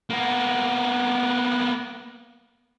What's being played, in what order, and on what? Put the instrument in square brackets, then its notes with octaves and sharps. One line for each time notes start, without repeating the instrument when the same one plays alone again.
[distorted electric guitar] A#3 B3